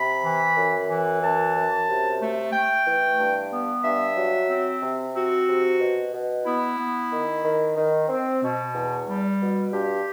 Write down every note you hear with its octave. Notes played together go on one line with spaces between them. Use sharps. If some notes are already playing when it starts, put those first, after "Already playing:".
Already playing: C3 B5
E3
F#2
E3
F#2 A5
F#2
C3
A3
A3 G5
E3
G2
B3
G2 E5
F#3
C4
C3
C4 F#4
C3
B2
B2
B3 E4
B3
D#3
D#3
D#3
C4
B2
E2
G3
B2
G2 G4